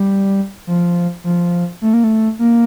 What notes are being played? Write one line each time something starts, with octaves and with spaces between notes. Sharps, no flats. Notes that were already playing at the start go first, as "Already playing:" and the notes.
Already playing: G3
F3
F3
A3
A#3
A3
A#3